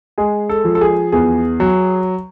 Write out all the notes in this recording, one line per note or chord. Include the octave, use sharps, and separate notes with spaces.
G#3 G#4
A4
F3
A4
G#4
E2 G#4
F#3